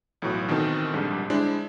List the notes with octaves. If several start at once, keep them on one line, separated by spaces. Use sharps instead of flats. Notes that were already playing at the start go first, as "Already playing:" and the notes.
B1 A2 E3 F#3 C#6
B2 D#3 E3 C4 D#4 A4
A#1 G#2 D3 G3
G#3 D4 E4 C5